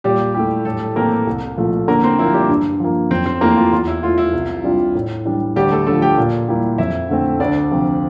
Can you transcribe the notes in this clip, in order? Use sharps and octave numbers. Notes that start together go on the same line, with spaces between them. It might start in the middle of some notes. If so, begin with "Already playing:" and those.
A#2 G3 G4
A3 E4 G4
A2 A3 A4
E3 A3 A#3 C4 G4 A#4
C2
A#2 F3 A3
D3 A#3 A#4
C4 C5
F3 A#3 E4
G3 G4
G2
F3 A#3
F2 C4 C5
C4 C5
E3 A3 A#3 E4 G4 A#4
F4
E2 F4
E4
E3 A3 E4 F4
E4
C2
C3 G3 D4 F4
A2
E3 G3 D4
D2 G3 G4
A3 A4
D3 F3 A3 A4
G4 G5
A#2
G3 A#3 E4 G4
F2 E4 E5
D3 A3 C4
D2 D4 D5
C3 F3 C4 F4